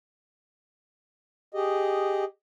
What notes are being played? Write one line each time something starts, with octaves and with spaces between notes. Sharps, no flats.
G4 G#4 D#5